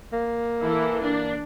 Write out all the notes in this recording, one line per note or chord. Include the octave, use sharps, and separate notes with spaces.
A#3
E3 E4 A4
A#3 D4